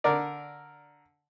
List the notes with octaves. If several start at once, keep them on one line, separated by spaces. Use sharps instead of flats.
D3 A#4 D5